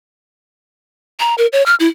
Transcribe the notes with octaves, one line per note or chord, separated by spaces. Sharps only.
A#5
A#4
C#5
F6
E4